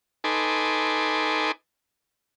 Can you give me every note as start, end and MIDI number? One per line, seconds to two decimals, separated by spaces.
0.24 1.52 63
0.24 1.52 69
0.24 1.52 71
0.24 1.52 80
0.24 1.52 84
0.24 1.52 86